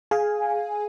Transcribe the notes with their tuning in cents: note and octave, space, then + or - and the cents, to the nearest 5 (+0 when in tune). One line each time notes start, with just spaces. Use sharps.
G#4 +15 F5 +5 G#5 -5